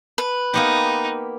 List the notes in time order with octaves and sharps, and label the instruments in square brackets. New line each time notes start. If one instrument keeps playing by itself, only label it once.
[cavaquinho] B4
[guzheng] A#3 B3 G4 [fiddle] D#4